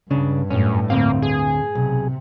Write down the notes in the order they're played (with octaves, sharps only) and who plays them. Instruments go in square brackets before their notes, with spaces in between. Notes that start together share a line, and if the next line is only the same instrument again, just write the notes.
[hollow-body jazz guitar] C#2 C#3 D4 [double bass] G2
[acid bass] F#2 [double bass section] A2 [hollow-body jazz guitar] C#4
[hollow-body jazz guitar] D2 C4 F5 [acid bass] A#3
[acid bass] G#4
[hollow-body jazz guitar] B1 [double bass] C3